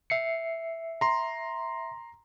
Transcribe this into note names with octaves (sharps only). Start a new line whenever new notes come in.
E5 C7 C#7
A#5 C6